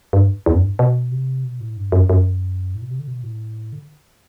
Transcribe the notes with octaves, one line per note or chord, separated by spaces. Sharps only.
G2
E2
F#2
G2
B2
C3
B2
A2
G2
F#2
F#2
A2
B2
C3
D3
B2
A2
D3